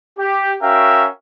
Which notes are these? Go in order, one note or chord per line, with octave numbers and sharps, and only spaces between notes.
G4
C#4 F#4 A#4 E5 F5 G5